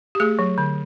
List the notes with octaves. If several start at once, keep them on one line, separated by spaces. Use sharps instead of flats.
G4
A3 G#4
F#3
D3